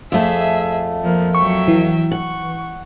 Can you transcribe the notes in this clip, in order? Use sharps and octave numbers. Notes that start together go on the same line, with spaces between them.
F2 A3 G#4 E5
F3 A#3 F6
F#3 E5 G5 C#6
E3
F#5 C#6